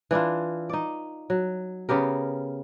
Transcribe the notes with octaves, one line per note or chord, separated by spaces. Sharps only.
E3 D4 E4 F4
D#4 D5
F#3
C#3 B3 G4 A#4